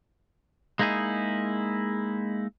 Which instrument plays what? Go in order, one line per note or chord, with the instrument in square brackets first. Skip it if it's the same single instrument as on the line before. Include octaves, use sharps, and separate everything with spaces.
[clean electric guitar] G#3 A#3 D#4 E4 G#4